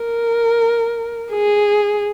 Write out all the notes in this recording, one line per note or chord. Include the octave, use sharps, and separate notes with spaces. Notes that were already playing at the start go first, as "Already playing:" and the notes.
Already playing: A#4
G#4